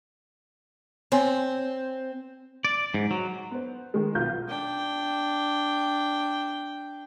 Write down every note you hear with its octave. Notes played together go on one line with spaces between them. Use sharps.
C4 C#5 G#5 C6
D5
G#2
F#3
B3 C5
D#3 G#3
B1 B3 F4 G6
D4 G5